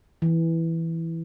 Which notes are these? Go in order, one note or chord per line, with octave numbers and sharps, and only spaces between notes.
E3